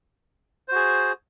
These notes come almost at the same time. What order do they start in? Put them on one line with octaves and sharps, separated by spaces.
C5 F#4 G#4